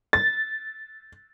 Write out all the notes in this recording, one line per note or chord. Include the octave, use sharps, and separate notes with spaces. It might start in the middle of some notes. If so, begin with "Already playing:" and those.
A6